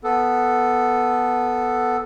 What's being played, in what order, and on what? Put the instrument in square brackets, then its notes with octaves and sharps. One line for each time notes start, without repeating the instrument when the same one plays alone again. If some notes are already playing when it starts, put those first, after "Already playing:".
[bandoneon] B3 A4